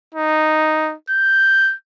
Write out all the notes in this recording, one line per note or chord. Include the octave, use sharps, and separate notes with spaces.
D#4
G6